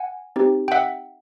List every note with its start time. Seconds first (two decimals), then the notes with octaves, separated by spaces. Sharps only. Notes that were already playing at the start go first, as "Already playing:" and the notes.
Already playing: F#5 G#5
0.36 C4 D#4 G4
0.68 G5
0.72 E5 F#5